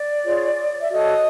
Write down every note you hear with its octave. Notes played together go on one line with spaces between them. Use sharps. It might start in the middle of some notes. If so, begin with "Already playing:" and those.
Already playing: D5
F4 G#4 C#5
E5
F#4 A4 C#5 D#5